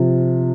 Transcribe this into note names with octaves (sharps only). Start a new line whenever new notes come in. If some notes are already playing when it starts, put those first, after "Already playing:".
Already playing: C3 F3